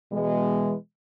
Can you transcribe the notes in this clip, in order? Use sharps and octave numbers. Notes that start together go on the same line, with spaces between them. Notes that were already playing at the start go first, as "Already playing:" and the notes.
B2 E3 G#3